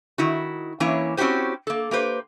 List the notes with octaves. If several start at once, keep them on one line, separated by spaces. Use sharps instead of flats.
D#3 E4 F#4
E3 A#3 C#4 E4 C#5
C4 C#4 E4 F#4 G4 C5
A#3 A4
A#3 G4 B4 C5